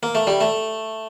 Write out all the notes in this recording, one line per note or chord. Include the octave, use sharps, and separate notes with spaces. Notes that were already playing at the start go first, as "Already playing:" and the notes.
A#3
A3
G3
A3